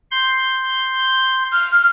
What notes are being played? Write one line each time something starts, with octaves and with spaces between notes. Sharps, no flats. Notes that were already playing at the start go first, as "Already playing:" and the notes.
C6 G6
F6